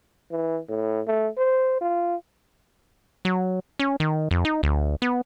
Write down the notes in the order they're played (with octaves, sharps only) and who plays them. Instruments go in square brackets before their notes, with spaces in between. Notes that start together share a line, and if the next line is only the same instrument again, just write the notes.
[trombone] E3
A2
A3
C5
F4
[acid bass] F#3
C#4
D#3
F2
D#4
D2
B3